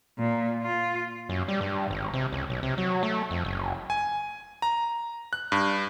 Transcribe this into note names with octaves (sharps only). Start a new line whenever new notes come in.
A#2
F4
F#2
G3
G2
G#1
C3
C#2
B1
C3
F#3
A3
F2
F#1
G#5
A#5
F#6
G2